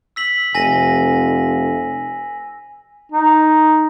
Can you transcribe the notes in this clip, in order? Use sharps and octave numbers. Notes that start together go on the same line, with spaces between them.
E6 B6 F#7
F1 G#5 A#6 D#7
D#4